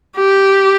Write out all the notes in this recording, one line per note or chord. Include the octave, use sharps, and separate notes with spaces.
G4